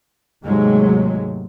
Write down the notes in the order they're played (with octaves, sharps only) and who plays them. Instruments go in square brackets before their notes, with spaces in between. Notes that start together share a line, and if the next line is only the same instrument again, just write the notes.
[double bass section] D#2 G#2 C3 F#3 G#3 A3